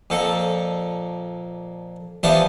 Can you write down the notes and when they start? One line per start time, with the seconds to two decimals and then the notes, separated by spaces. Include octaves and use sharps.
0.10 F2 A#2 A4
2.23 E2 F3 G3 B3 E5 A5